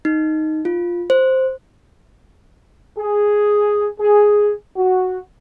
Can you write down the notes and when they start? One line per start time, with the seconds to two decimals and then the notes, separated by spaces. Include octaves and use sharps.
0.05 D#4
0.65 F4
1.10 C5
2.98 G#4
3.99 G#4
4.76 F#4